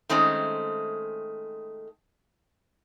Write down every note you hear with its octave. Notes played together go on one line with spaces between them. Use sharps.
D#3 G#3 A3 C4 C#4